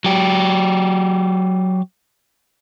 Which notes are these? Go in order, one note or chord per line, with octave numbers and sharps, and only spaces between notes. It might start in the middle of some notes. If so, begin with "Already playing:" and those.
F#3 G4